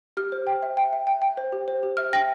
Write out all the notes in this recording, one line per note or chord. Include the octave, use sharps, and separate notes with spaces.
G4 F6
C5
G5
E5
G5
E5
G5
G5
C5
G4
C5
G4
E5 F6
G5 A#6